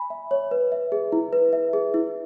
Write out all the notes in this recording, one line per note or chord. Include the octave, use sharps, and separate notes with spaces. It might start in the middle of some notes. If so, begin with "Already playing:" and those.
Already playing: G#5 B5
E5
C#5
B4
E5
G#4
E4
B4
E5
G#4
E4